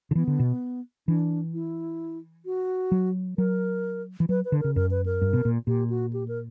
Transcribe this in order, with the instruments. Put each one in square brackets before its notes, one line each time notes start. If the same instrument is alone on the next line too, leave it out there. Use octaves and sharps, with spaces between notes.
[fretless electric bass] D3
[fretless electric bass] E3 [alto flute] B3
[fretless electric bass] D3
B2
[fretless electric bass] E3 [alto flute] D4
[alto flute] E4
F#4
[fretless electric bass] F#3
[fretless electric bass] F#3 [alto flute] A#4
[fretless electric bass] E3
[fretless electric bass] F#3 [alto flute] B4
[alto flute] B4
[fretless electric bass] D3
[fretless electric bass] C#3 [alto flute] A#4
[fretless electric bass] F#2 [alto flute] A#4
[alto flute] B4
A#4
[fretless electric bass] G2
B2
A#2
[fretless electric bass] A#2 [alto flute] G4
[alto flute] F#4
G4
A#4